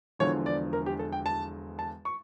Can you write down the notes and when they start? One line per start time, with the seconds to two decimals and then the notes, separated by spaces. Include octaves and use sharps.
0.19 E1 E2 D3 F3 C#5
0.46 D5
0.73 A#4
0.86 G4
0.99 A4
1.12 G5
1.26 A5
1.79 A5
2.05 C#6